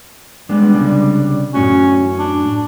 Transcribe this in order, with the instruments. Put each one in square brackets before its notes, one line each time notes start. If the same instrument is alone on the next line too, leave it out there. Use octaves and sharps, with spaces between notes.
[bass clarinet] G3 [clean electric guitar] G#3 B3 D4
[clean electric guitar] C2 C#3 D4
[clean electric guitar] F#2 A2 F#4 [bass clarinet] C#4
[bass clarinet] D4